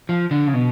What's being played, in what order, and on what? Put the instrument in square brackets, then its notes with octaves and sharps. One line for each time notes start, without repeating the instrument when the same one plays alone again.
[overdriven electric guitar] F3
D3
C#3
B2